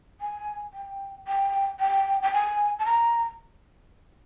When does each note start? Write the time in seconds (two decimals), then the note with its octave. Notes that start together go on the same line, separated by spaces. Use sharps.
0.21 G#5
0.73 G5
1.28 G5
1.80 G5
2.22 G5
2.33 G#5
2.79 A5
2.86 A#5